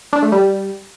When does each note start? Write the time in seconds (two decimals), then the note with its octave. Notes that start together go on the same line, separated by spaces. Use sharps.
0.13 D4
0.22 A3
0.32 G3